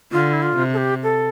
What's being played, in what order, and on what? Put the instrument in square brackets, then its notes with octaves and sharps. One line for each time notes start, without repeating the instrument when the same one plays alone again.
[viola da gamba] D3 [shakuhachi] F4
[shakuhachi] E4
F4
[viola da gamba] C3
[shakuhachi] A4
G4
A4